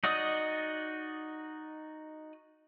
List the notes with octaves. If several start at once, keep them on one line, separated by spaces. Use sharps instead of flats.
D#4 F#4 D5 D#5 D#6